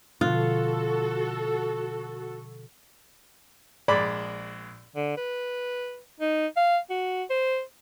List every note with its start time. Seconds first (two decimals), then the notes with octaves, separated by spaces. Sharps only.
0.21 B2 D3 F3 F4 F#4 A4
3.88 A#1 G#3 D5 B5
4.95 D3
5.17 B4
6.20 D#4
6.57 F5
6.90 F#4
7.30 C5